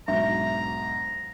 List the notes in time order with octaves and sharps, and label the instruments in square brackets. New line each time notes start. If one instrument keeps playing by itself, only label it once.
[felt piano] B1 G#2 [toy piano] D4 D#4 E5 [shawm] A#5